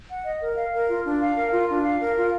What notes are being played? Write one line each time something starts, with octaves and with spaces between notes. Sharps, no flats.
F#5
D#5
A#4
F5
A#4
F4
D4
F5
A#4
F4
D4
F5
A#4
F4